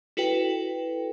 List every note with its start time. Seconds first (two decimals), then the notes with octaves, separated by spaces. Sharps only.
0.17 E4 F#4 A4 B4 G5